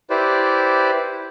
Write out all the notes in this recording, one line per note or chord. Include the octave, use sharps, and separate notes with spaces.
E4 G4 B4 C5 D5